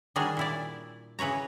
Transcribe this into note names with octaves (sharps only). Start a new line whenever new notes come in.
D#3 G3 D4 F#4 G#4
A#2 E4 D5
C#3 E3 B4 C#5 A#5